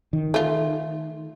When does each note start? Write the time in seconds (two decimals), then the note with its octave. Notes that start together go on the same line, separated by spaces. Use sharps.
0.13 D#3
0.34 A3 F4